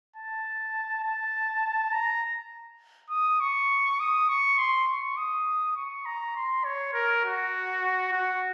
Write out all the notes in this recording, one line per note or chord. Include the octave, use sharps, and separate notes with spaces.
A5
A5
A#5
D#6
C#6
D#6
C#6
C6
C#6
D#6
C#6
A#5
C6
C#5
A#4
F#4
F#4